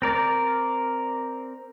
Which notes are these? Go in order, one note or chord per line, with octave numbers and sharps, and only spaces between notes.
C4 A#4 D5